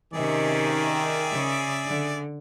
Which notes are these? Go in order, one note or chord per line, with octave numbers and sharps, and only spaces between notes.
C3 D#3 C#4 G#4 D5 E5
C#3
D3